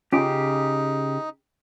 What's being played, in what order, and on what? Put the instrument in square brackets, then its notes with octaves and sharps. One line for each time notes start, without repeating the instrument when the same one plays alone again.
[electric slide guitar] C#3 G4 [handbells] C#4 F4 D7 [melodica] D#4